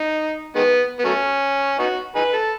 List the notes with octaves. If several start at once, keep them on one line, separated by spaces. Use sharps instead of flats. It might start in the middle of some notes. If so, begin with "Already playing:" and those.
Already playing: D#4
D#3 G#3 B3
B3
F#3 A3 C#4
B3 D#4 F#4
D#4 G#4 B4
A4